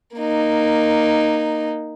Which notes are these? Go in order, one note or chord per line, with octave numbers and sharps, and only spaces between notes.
A#3 D#4